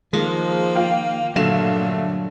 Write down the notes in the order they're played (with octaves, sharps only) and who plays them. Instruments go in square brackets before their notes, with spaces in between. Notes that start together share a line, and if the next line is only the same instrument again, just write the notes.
[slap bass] D#3 [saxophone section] F3 [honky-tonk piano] G#3 [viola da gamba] A#3
[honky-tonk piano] F4 F5 G5
[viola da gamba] G2 A#2 [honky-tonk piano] D3 F5 E7 [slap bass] F#3 [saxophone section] A3